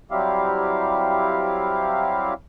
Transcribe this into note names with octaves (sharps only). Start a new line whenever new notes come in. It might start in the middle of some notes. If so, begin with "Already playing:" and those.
F#3 G3 C4 E4 G4 F5